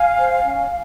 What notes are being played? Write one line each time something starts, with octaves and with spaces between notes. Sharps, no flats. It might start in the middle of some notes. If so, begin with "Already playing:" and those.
Already playing: F5 G#5
C5
C#4